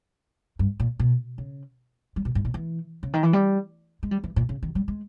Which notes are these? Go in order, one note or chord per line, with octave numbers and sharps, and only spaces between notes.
G2
A#2
B2
C#3
G3
B2
G#2
A#2
E3
C#3
D#3
E3
G3
G#3
G3
E3
A#2
C#3
D#3
G3
G#3